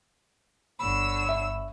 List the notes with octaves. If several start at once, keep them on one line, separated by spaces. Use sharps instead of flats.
G1 D3 C#5 B5 E6
E5